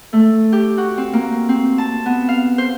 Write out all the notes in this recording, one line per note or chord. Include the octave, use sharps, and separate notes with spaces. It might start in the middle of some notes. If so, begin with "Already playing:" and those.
A3
G4
F#4
C4
A#3
C4
A5
B3
F5
C5